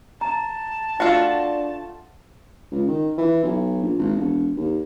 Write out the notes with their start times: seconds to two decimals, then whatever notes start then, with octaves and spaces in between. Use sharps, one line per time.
0.21 A5 A#5
1.00 A3 D4 F4 F#4 F#5
2.71 C#2
2.87 D#3
3.18 E3
3.43 B1
3.82 A#1
3.98 G#1
4.16 E1
4.57 D#2